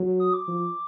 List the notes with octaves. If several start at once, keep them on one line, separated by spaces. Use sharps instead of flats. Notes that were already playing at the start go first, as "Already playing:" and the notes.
Already playing: F#3
D#6
D6
F3